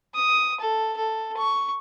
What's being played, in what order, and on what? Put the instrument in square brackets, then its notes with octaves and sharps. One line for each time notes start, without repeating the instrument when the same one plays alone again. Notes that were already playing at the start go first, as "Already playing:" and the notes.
[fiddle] D#6
A4
A4
C#6